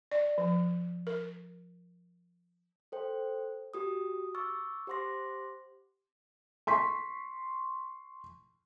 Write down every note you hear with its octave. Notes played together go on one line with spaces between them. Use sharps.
D5
F3
A#4
A4 C5 G5
F#4 G4 D#6
C#6 D6 E6 F6 A6
G4 C5 F#5 C6 D6 A#6
C6 C#6 B6